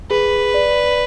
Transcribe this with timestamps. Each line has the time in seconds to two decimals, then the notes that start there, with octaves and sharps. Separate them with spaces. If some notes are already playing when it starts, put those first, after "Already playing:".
0.11 G#4 B4
0.54 D5